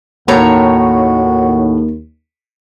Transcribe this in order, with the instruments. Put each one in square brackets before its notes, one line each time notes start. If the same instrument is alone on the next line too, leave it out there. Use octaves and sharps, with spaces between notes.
[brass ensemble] D#2 [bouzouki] A2 C#5 A#5 [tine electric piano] A#3 [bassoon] F#4